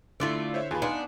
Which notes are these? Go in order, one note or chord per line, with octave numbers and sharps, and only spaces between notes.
D3 A3 E4 F4 D5
C5 C#5 E5
D#2 F4 G#4 B4
B3 D4 D#4 F5 G#5 C6